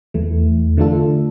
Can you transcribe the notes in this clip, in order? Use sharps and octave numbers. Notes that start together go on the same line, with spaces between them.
E2 E3 A3
D3 A3 D4 F4 A4